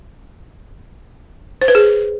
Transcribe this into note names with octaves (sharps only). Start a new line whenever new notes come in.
C5
B4
G#4